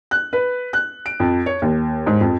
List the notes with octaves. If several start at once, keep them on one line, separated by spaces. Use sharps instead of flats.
F#6
B4
F#6
D7
F2
C#5
D#2
G#2
F2